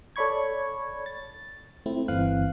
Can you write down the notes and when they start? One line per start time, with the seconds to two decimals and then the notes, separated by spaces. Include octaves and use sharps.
0.16 A4 C#5 D5 B5 C#6 G#6
1.06 A6
1.86 A3 C4 E4
2.08 G1 E3 C4 F5 F#6